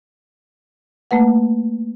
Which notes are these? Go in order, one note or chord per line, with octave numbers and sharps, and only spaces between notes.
A3 A#3 B4 F#5